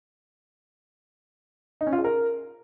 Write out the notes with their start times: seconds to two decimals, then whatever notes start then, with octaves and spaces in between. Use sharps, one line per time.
1.81 D#4
1.87 C#4
1.93 F4
1.99 G#4
2.04 A#4